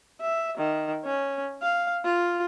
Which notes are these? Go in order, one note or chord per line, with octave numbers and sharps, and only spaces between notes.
E5
D#3
C#4
F5
F4